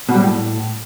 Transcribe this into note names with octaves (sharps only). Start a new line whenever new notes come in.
B2
G3
A2